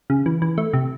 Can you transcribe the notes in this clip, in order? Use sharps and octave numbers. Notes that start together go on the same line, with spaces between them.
C#3
E3
E3
A3
C3